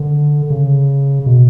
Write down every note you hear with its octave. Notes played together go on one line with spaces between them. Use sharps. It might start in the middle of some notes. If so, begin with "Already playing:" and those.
Already playing: D3
C#3
B2